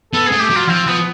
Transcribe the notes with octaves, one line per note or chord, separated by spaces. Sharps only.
B3 A4
A3 G#4
G4
F#3
F4
F3 C4
F3 B3